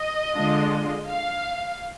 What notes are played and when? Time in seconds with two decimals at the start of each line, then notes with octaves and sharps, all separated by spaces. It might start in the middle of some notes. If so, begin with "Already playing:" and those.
Already playing: D#5
0.35 D3 G#3 D4 F4
1.10 F5